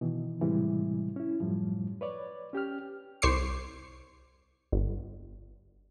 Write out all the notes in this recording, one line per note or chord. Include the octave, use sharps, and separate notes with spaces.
B2 D#3 E3
A2 C3 E3 G3 G#3
C#4 E4
F#2 A2 F3 G3
B4 C#5 D5
C#4 G4 G5 F6
C2 C5 C#6 D6 C7
G1